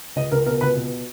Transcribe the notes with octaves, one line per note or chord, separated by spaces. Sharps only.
C#2 D#5
C#2 A#4
B2 A#4
C#2 B4
B2